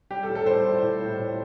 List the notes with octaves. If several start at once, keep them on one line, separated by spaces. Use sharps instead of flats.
G3 G4
A4
A2
A4
G3 C5
A2
A2
A2
A2